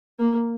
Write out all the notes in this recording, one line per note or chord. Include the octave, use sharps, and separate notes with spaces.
A#3